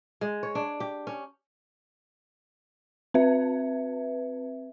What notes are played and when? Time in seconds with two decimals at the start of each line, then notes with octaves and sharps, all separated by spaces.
0.21 G#3
0.43 C#5
0.55 D4
0.80 G4
1.07 C#4
3.14 C4 B4 E5